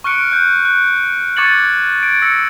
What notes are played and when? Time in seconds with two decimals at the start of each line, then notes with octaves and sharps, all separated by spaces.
0.04 C#6 F6 F#6 C#7 D7
0.32 F#6 G6
0.65 F#6
1.37 C#6 D6 G#6 A6 C#7 F#7
2.03 G#6 D7
2.22 E6 A#6 C#7